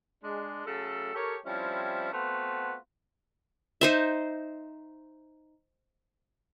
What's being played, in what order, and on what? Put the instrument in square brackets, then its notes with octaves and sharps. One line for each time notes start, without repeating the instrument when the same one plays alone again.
[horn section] G#3 D4
C#3 F#3 A3 A4
G4 A4 A#4 C#5
F3 G3 C4 C#4 E4
A3 B3 C4 F4 F#4 B4
[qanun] D#4 C5 E5